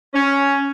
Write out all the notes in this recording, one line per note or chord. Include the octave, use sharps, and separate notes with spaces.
C#4